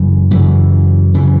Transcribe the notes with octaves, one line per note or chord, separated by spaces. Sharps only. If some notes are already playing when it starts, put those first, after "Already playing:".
Already playing: F#2 C#3 E3
F#2 C#3 E3
F#2 C#3 E3